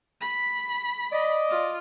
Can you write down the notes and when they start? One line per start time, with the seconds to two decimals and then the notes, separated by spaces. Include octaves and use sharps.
0.21 B5
1.12 D5 D#5
1.49 F4